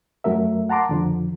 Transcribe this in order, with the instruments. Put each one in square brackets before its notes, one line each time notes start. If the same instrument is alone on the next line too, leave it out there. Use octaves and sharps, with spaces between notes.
[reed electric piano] F#2 F#3 A3 A#4 E5
F#5 A5 A#5 C6 D6
F2 D3 F3